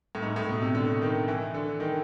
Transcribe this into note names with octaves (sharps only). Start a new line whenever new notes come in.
A2
G#2
A2
B2
C3
D3
D#3
E3
D3
D#3